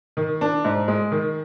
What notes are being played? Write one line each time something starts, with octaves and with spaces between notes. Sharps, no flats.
D#3
D4
G#2
G#3
D#3